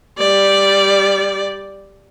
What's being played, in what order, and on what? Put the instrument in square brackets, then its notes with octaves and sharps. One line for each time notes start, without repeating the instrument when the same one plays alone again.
[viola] G3 D5